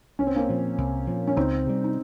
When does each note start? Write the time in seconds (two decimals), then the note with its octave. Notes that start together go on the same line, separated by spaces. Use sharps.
0.19 C2 C#4
0.27 C4
0.36 A#3 C#4
0.49 A#2 F3
0.78 C2
1.07 A#2 F3
1.27 C#4
1.36 C#2 C4 D#4
1.66 C3 G3
1.84 D#4